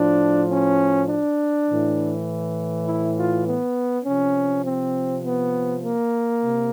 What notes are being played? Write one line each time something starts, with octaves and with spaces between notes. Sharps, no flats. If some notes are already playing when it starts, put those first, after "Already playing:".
Already playing: A2 F3 D4
C#4
D4
A2 E3
E4
F4
B3
C3 F3 C#4
C4
B3
A#3
C3